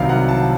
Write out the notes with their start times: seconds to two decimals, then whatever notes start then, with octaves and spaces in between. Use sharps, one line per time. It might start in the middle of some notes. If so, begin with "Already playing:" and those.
Already playing: C2 C3 D#3 F#3 F5
0.09 F#5
0.28 A5